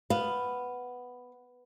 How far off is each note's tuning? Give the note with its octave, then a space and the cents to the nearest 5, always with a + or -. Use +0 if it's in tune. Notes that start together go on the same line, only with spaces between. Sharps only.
B3 +5 F5 +0